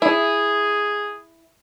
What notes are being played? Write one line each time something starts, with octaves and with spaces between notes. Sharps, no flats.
E4 G#4